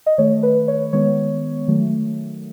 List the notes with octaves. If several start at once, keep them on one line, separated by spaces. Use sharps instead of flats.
D#5
D#3 A3 C#5
B4
C#5
D#3 G#3 B3 C#5
D#3 F#3 A3